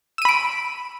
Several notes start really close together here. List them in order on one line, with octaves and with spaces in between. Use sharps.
E6 D#7 B5 D7